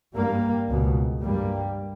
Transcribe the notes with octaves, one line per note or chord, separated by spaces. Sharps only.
G2 G3 A#3
C#2 B2
G2 G3 A#3